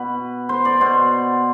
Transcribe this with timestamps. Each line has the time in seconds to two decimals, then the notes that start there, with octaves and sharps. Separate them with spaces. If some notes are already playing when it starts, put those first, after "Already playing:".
Already playing: B2 B4
0.49 C5
0.65 D5
0.81 B2 C5